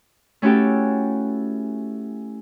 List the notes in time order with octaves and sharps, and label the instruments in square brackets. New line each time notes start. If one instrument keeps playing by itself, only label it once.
[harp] A3 C#4 E4 F#4 G4 A4